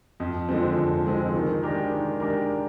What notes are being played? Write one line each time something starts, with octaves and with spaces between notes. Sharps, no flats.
F2
D3 F3 G#3 C4
F2
D3 F3 G#3 C4
D#3
G#3 D4 G4 A#4
D#3
G#3 D4 G4 A#4